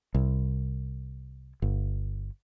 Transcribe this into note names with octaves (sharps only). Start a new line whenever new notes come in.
C2
G1